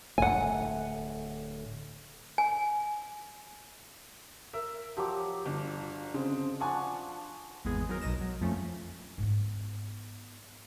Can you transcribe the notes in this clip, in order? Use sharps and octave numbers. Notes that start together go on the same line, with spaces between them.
D1 D#2 A3 F#5 G#5
G#5
A#4 E5
F3 F#3 G4 D6
G1
C#3 G#3 C4
F3 D4 F#5 G#5 C#6
G#1 E2 G#3 B3 G#4
F#3 D#4 A#4
B1 B2 D#4 D#5 A#6 E7
F#3
F2 F3 A3 C#4
G#2 B3